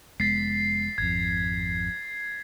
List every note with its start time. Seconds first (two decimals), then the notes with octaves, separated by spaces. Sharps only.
0.20 F1 G#3 B3 A6 B6 C7
0.98 G#1 F2 G#6